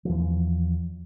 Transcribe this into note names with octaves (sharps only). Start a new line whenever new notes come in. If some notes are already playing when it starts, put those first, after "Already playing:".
E2 C#3 E3 F3